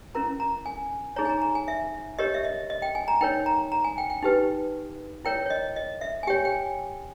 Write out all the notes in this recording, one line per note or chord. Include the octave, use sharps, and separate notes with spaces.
C#4 E4 A#4 A#5
A#5
G#5
D#4 G#4 C#5 A#5
G#5
A#5
A#5
G#5
E5
G4 A#4 C#5 D#5
E5
D#5
D#5
G5
G#5
A#5
D#4 A#4 C#5 G5
A#5
A#5
G#5
G5
G5
D#4 G4 B4
E4 A#4 C#5 G5
C#5
D#5
D#5
E5
G#5
G4 C#5 G5
G5
G#5